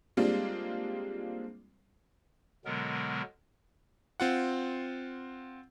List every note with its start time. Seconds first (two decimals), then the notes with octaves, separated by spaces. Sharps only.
0.17 G3 G#3 A#3 C4 D4 F4
2.65 B2 D3 F#3 G#3 B3 A#4
4.20 C4 F4 F#5